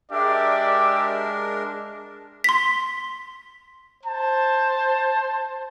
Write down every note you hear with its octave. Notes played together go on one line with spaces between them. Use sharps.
G#3 D4 G4 A#4 D5 E5
C6 B6
C5 A5